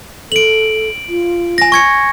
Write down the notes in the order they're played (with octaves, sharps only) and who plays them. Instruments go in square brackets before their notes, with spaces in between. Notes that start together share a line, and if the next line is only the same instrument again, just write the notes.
[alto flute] A4 [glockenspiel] D7 F#7
[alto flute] F4
[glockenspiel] G#5 A#6
C#6 G#6 C#7